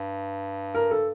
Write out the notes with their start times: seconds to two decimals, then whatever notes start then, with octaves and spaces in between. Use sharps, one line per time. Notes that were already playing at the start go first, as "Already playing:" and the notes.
Already playing: G2
0.74 A#4
0.91 A4